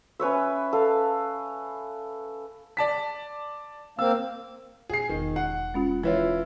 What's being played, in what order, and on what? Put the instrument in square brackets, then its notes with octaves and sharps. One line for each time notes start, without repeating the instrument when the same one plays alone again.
[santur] C#4 B4 C#5 E5
A4 F5
[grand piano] D5 A5 B6
[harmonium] A#3 C4 F5 [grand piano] E6
[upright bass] B2 [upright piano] G#4 C7
[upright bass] E1 [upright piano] D#3
[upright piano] F#5
[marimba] G#3 C#4 F4
[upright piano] E3 E4 F4 [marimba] B4 C#5